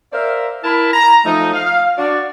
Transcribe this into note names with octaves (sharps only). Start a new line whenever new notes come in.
A#4 C5 D5 E5 F5
E4 A#4 A5 B5
A#5
F3 A3 D#4
F5
D4 F#4 D5